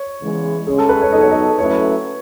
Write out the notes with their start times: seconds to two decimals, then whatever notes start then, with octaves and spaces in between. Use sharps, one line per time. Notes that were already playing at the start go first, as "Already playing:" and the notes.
Already playing: C#5
0.21 E2 C#3 E3 G#3
0.66 C#3 G#3 C#4 G#4
0.78 A4
0.89 B4
1.01 C#5
1.12 F#3 B3 D#4 A4 D#5
1.21 C#5
1.31 D#5
1.58 F#3 A3 C#4 E4 B4 C#5